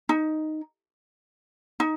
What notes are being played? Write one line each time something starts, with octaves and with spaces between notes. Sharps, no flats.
D#4
D#4